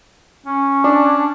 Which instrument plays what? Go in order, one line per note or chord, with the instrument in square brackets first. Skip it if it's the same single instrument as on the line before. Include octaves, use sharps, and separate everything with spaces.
[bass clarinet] C#4
[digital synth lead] D4